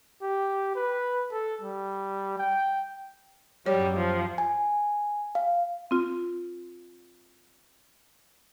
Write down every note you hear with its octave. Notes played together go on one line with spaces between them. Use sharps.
G4
B4
A4
G3
G5
F#2 F#3 G3 C#5
F3
G#5
F5
C4 F4